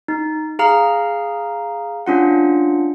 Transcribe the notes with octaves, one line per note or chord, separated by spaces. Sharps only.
D#4
G#4 F5 A#5 F6
C#4 D4 F4 F#5